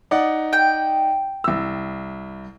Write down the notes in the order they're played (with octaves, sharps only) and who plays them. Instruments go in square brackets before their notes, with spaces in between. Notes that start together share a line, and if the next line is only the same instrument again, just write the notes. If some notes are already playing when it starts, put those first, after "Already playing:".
[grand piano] D#4 D5 F#5
[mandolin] G5
[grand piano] C2 E6